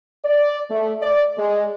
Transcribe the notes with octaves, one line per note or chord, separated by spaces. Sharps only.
D5
A3
D5
G#3